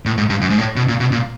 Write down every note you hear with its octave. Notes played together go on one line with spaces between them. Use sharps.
A2
G#2
G2
F#2
G#2
A2
B2
A#2
B2
A#2